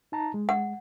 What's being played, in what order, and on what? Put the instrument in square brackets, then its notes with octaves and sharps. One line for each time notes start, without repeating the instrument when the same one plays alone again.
[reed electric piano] D#4 A5 A#5
G#3
[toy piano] F#5